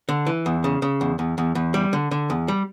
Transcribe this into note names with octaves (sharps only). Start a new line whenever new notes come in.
D3
E3
E2
C#3
C#3
E2
E2
E2
E2
G3
D3
D3
E2
G3